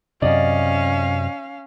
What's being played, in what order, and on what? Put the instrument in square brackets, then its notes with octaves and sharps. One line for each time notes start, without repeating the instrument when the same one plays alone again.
[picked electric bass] F#2 C3 [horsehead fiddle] C#4 F5 [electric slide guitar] D5 D#5